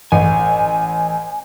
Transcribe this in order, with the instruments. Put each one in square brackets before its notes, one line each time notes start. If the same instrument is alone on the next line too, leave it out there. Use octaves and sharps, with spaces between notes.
[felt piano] A1 [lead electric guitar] G#5